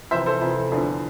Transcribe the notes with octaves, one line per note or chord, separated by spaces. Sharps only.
F2 C3 E3 C5 E5
A4 C5
F2 C3 E3
E2 D3 F3